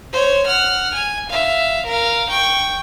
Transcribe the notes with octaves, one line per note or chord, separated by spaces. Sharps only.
C5 C#5
F#5 F6
G#5
E5 F5
A#4 F5
G5 C#6